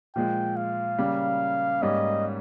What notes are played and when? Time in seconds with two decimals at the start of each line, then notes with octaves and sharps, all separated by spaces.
0.15 A#2 F3 G#3 G5
0.56 F5
0.98 C#3 G3 A#3
1.82 G#2 G3 A#3 C#4 D#5